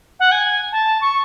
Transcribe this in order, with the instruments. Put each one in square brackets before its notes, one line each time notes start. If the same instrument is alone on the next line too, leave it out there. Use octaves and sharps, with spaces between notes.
[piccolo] F#5
G#5
A5
C#6